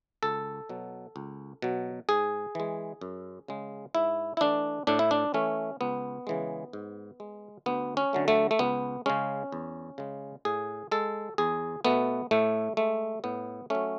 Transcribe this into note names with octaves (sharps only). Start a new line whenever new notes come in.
C#2 A4
B2 F#3
C#2
B2 F#3
G#2 G#4
E3 G#3
F#2
C#3 G#3
G#2 E4
E4
E3 A3 D4
A2 D4
E4
D4
E3 A3 C#4
C#2 B3
C#3 E3 G#3
G#2
G#3
D2 B3
C#4
D3 F#3 A3
A3
A3
C#2 B3
C#3 G#3 C#4
E2
C#3 G#3
A2 G#4
G#3 A4
E2 G#4
B2 A3 B3
A2 A3
G#3 A3
A2 B3
F#3 A3 C#4